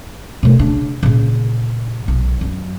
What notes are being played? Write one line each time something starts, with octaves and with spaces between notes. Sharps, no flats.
B2 A3
C#3 D4
A#2 C#3
B1
F#2